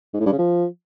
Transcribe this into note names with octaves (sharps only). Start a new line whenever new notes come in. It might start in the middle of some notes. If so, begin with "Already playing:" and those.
G#2
A2
G2
C#3
F3